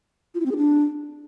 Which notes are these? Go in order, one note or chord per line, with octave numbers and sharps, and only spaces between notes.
F4
E4
C4
G#4
D4